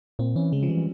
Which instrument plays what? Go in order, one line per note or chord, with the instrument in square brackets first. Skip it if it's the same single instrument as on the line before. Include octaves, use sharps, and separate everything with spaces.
[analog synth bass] A#2 [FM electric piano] C4
[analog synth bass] E3 [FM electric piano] C#4
[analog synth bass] C#3 [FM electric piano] G#3
[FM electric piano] F3
[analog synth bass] E3 [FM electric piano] G3